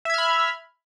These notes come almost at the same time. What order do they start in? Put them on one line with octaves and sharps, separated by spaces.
E5 G#6 F6 B5